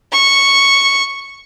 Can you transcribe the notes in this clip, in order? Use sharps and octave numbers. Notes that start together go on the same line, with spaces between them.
C#6